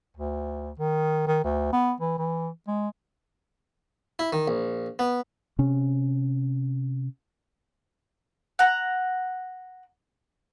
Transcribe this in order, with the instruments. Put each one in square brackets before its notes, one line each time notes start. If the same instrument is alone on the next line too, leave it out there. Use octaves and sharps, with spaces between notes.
[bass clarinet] D2
D#3
D#3
D2
B3
E3
E3
G#3
[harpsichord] E4
D#3
A#1
B3
[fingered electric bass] C3 C#4
[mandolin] F#5 A#5